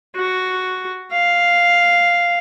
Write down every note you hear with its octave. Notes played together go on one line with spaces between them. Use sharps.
F#4
F5